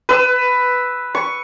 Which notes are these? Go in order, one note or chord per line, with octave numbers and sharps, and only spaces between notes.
B4 E6
C#6